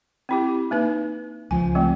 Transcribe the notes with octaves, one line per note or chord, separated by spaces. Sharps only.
C4 E4 G4
A#3 D#4 B4
C#2 F3 G#5
G3 A3 C4